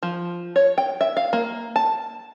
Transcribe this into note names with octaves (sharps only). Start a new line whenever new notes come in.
F3
C#5
G5
E5
F5
A#3
A5